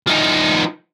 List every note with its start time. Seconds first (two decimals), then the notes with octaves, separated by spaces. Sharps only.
0.07 F3 D#4